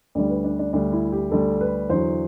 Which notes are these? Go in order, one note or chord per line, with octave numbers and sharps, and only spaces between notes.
D2 D3 G3 D5
B4
D4
D4
D2 D3 G3 D4
E4
G4
D2 D3 G3 A4
B4
E2 D3 F#3 C5